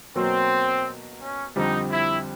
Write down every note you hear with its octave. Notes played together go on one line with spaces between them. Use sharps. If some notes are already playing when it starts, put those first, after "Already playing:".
B2 F#3 A#3 C4
C#4
F2 D3 G3 C4 D#4
E4